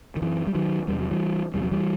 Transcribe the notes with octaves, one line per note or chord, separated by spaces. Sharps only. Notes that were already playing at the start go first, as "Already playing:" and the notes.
D#3
F#2 E3
G3
D#3 F#3
E2 C3 G3
F#3
E3 G3
E2 C3 G3
F#3
E3 G3